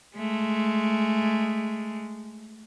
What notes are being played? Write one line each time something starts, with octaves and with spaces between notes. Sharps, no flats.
G#3 A3